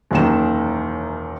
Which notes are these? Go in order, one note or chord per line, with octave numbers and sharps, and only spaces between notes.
E1 F#2 D#3 A#3 E7